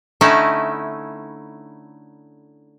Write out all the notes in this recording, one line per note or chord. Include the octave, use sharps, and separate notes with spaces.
D3 A3 C#4 D#4 E4